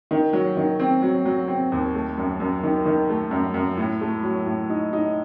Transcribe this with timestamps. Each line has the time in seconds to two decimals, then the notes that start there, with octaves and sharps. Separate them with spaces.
0.11 D#3
0.33 F#3
0.57 D#3
0.80 C4
1.03 F#3
1.25 F#3
1.48 C4
1.72 D#2
1.95 A3
2.18 F#2
2.40 F#2
2.63 D#3
2.86 D#3
3.10 A3
3.31 F#2
3.54 F#2
3.77 A2
4.01 A3
4.23 F#3
4.46 A2
4.70 D#4
4.93 D#4